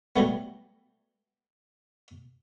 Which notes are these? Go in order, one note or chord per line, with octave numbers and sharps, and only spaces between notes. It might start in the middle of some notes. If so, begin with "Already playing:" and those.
F#3 G3 A3 B3